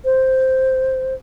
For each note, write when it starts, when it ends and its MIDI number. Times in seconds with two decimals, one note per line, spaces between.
0.05 1.14 72